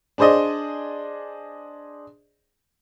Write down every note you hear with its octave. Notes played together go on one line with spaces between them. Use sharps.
D4 G#4 C5 D5 D#5